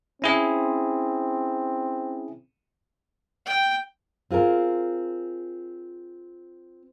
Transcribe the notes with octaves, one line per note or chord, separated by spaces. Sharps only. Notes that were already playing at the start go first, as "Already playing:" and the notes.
C4 C#4 E4 G#4
G5
C4 F4 G#4 A#4